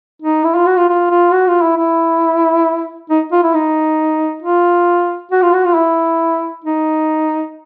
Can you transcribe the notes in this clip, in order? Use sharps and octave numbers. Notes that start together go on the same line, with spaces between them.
D#4
E4
F4
F#4
F4
F4
F4
F#4
F4
E4
E4
D#4
F4
E4
D#4
F4
F#4
F4
F#4
F4
E4
D#4